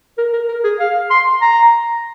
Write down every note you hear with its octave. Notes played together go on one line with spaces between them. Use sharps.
A#4
A#4
A#4
G#4
F5
C6
A#5